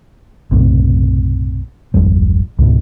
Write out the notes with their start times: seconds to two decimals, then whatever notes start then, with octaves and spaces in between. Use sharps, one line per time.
0.52 B1 F#2 A2 C3
1.94 D1 G#1 F2 G3
2.59 C#2 G#2 B2